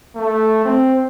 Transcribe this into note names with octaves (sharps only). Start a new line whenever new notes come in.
A3
C4